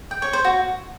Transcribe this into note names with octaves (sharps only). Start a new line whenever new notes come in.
G5
C#5
C5
F#4